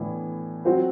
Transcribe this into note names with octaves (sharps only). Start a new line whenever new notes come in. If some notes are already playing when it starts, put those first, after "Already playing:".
Already playing: A2 E3 B3 D4
F#3 C4 F#4 C5